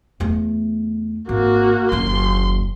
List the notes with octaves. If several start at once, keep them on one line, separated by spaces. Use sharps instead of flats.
E2 A3
G#1 A#3 F#4
F#1 D#2 C6